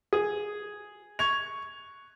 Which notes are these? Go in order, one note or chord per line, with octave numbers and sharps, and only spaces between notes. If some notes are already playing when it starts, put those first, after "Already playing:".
G#4
C#6 G#6 F7